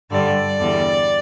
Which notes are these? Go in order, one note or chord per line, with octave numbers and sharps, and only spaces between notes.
G2 D3 G3 D5
E2 D3 G3